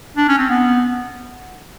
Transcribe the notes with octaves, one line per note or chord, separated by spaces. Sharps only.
D4
C#4
C4
B3